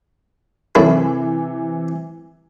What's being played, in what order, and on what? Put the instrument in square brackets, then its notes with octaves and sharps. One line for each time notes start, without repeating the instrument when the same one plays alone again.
[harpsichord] F#2 E4 A4 [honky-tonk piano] C3 E3